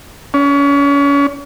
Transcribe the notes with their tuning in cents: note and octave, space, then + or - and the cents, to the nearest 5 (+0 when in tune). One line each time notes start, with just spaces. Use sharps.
C#4 +35